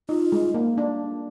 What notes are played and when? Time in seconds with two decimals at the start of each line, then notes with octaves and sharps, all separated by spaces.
0.09 D#4 F4
0.32 G#3
0.54 A#3
0.78 D4